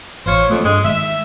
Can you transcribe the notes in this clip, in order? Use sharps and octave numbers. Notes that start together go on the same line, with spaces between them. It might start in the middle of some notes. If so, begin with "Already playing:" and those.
A1 F4 C5 C#5
F2 A3
G2 G#3
D#3 G#3 E5